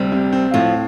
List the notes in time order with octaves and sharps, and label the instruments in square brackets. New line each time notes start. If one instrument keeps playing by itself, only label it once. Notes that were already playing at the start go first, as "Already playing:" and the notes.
Already playing: [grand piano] D2 C3 C4 [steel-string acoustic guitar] G3
[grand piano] C3
C4
[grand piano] A2 [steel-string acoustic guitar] F3